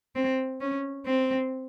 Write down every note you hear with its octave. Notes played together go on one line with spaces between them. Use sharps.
C4
C#4
C4